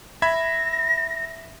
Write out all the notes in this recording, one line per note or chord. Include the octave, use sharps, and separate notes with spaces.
E5 B5 G#6 A#6